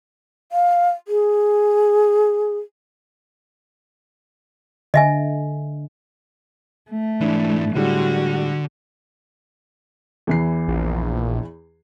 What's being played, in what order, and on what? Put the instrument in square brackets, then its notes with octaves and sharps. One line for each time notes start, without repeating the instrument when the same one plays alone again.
[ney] F5
G#4
[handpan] D3 [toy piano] D#5 E5 G#5
[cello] A3
[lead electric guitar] G#2 E3 [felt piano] D4 E4
[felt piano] A2 G3 G#3 [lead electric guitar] D3 [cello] F#4
[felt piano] E2 E3 C7
[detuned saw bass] A#1